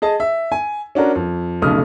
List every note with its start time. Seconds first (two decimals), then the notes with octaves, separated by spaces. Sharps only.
0.02 G#4 D#5 A5
0.20 E5
0.52 G#5
0.95 C#4 D4 F#4 A#4
1.15 F2
1.62 F1 B1 C#3 A3 D#6 F6